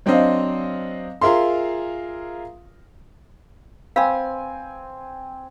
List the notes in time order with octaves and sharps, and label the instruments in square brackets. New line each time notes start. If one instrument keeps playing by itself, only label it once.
[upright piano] F#3 C4 D4 C5 D#5 F5
F4 G#4 A#4 E5 F5 C6
[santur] C4 G#5 [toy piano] F5 B5 E6